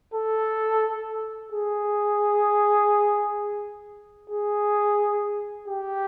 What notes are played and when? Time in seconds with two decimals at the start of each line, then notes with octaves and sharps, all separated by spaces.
0.14 A4
1.52 G#4
4.30 G#4
5.68 G4